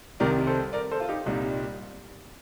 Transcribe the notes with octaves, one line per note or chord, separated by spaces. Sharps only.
C2 C3 D#3 G3 A#4 D5
A4 C5
A#4 D5
A4 C5
F4
D#4 G4
C2 A#2 G3 D#4